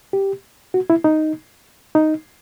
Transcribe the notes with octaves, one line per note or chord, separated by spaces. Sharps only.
G4
F#4
E4
D#4
D#4